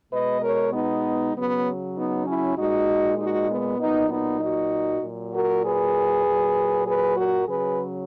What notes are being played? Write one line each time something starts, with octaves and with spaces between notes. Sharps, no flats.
B2 G#3 B4 D#5
A#4 C#5
B3 D#4
C#3 F#3 B3
B3 D#4
C#4 E4
A#2 G#3 D#4 F#4
D#4 F#4
B3
A#2 F#3 B3 D#4
B3 D#4
D#4 F#4
A#2 F#3
F#4 A#4
G#4 B4
A#2 F#3
G#4 B4
F#4 A#4
C#3 F#3 G#4 B4